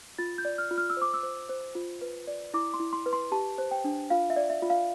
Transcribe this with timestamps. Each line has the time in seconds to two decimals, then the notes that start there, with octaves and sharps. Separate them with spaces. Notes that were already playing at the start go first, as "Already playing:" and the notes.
0.18 F4 A6
0.38 G6
0.45 D5
0.58 F6
0.71 F4
0.78 F6
0.90 E6
0.97 C5 D6
1.14 E6
1.23 C5
1.49 C5
1.75 F4
2.01 B4
2.27 D5
2.54 E4 D6
2.74 C6
2.80 E4
2.93 C6
3.06 B4
3.13 C6
3.32 G4 A5
3.58 C5
3.71 G5
3.84 D4
4.10 F4 F5
4.30 E5
4.36 D5
4.50 E5
4.62 F4
4.70 F5